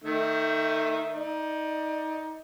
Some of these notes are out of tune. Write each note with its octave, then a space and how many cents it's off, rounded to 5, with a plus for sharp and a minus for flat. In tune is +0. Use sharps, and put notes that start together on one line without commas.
D#3 +0 A3 +35 E5 +0
D#4 +20 D5 +30